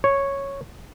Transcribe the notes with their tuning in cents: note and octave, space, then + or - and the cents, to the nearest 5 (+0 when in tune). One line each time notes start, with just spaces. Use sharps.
C#5 -5